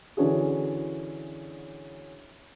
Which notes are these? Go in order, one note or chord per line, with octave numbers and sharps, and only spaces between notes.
D3 E3 C#4 D4 F#4 G#4